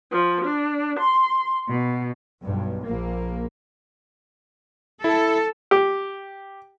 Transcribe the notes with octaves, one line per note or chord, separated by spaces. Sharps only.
F3
D4
C6
B2
B1 G2
A#1 A#3
E4 A4
G4